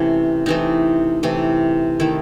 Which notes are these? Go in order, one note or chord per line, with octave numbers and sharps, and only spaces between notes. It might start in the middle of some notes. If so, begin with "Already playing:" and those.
Already playing: C3 E3 A3 C#4
C3 E3 A3 D#4
C3 E3 A3
D#3 A3 E4